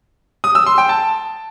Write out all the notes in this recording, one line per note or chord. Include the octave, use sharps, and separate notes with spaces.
D#6
E6
C6
G5
A5